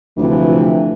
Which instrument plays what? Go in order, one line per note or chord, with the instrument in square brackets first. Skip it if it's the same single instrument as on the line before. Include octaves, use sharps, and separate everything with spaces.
[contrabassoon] D2 [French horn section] C3 E3 F3